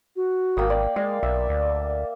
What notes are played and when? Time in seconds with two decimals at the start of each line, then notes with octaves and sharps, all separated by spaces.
0.16 F#4
0.57 G#1 A#3 G5 D#6
0.70 D5
0.96 G#3 D5 F5
1.23 B1 E5
1.49 D2